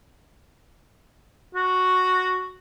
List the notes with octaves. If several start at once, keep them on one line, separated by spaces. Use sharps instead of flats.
F#4